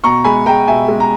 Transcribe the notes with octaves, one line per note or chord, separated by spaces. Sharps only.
B2 A#5 C#6
G#3 G#5 B5
G#3 G5 A#5
B2 E5 G#5
G#3
A#5